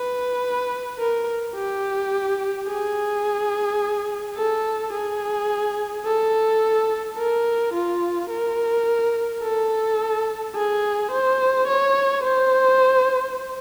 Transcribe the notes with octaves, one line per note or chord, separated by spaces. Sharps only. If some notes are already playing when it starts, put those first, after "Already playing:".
Already playing: B4
A#4
G4
G#4
A4
G#4
A4
A#4
F4
A#4
A4
G#4
C5
C#5
C5